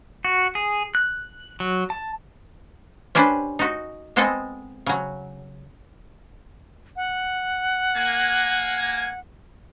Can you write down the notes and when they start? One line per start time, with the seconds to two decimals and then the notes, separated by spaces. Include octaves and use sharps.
0.25 F#4
0.55 G#4
0.95 F#6
1.60 F#3
1.90 A5
3.15 C#4 D4 G4 B4 C5
3.59 D#4 F#4
4.16 G#3 B3 C4 A4 D#5 G#5
4.86 C#3 F#3
6.96 F#5
7.96 A#3 G#5